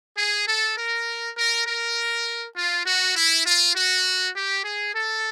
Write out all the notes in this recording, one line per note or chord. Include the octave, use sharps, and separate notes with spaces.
G#4
A4
A#4
A#4
A#4
F4
F#4
E4
F4
F#4
G4
G#4
A4